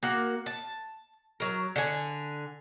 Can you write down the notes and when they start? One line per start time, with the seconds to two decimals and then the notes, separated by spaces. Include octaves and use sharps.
0.03 A#3 F#4
0.46 A5
1.40 F#3 A#4
1.76 D3 G#5